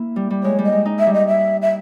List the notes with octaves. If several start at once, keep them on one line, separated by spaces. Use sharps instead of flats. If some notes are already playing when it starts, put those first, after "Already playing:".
Already playing: A#3 E4
G3
G3
G#3 C#5
G3
D#5
G#3
D#4
E5
G3
D#5
E5
E5